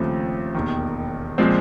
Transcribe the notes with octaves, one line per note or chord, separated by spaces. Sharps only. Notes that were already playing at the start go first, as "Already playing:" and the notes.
Already playing: D#2 C#3 F3 A3 C4
E1 D#2 D#3
A#2 F3 G#3 C4